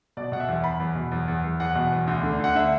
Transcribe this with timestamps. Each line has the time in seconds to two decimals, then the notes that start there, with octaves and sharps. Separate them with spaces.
0.17 B2 D5
0.32 B2 F#5
0.40 E5
0.48 E2
0.64 E2 B5
0.80 E2
0.96 B2
1.12 E2
1.28 E2
1.44 E2
1.60 E2 F#5
1.75 B2
1.92 E2
2.07 D2
2.23 D3
2.40 D2 F#5
2.55 D3 E5